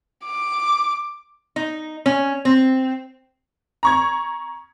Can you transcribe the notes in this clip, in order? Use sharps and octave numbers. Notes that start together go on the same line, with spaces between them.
D6
D#4
C#4
C4
A#5 C#6 G#6